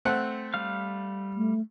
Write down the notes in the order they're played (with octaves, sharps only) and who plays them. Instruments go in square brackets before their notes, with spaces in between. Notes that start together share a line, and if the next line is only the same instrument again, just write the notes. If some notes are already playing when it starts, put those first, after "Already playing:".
[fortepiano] A3 C4 F#5
[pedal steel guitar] G3 F5 F6
[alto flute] A3